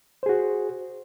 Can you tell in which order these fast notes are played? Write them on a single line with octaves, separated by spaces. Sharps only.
C5 G#4 F#4